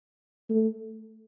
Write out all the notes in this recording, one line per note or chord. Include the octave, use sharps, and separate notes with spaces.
A3